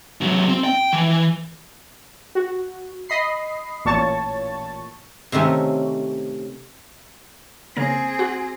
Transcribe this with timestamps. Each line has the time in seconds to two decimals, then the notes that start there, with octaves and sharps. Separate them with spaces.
0.21 C3 F#3
0.49 C4
0.64 G5
0.93 E3
2.35 F#4
3.09 D#5 B5 C7
3.85 A1 A#2 C#5 A5 C#6 A6
5.32 C3 D#3 A3 C#4
7.76 C#3 A#3 C4 G#4 A#6
8.19 F#4 F#5